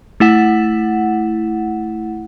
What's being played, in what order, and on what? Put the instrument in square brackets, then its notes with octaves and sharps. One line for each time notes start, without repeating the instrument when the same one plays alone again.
[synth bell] A3 E4 F#5